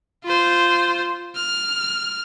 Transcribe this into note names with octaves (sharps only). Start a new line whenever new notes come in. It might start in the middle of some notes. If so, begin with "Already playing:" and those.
F4 C5
F6